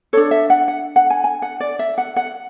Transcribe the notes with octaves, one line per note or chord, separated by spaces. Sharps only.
D4 A4 C#5
E5
F#5
F#5
F#5
G#5
G#5
F#5
D5
E5
F#5
F#5